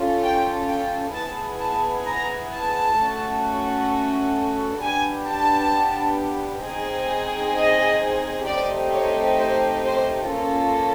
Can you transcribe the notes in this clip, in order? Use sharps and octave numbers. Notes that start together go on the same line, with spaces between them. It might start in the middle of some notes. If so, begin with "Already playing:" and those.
Already playing: C#4 F4 A4
G5
G5
B3 E4 G#4 A5
A5
A#5
A5
A3 C#4 F#4 A4
B3 D4 G4 G#5
A5
C4 D#4 G#4
D#5
A3 C4 D#4 G4 D5
C#5
C5
C5
A#3 C#4 F4 A4